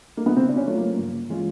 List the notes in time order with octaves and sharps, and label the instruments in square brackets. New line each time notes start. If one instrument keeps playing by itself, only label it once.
[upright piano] A#3
B3
[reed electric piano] C#3 [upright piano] C4
[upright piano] D4
C#4
[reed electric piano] F#3 A3 C#4 F4
[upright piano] A#3
[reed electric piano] G2
E3 G#3 C#4 F4